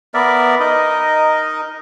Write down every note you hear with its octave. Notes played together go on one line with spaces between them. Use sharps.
B3 A#4 D5 E5
D#4 A#4 D#5